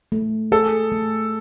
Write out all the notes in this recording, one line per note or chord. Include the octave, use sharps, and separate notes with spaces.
A3
G#4 A4
A3